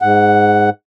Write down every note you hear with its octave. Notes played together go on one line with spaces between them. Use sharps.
G#2 F#5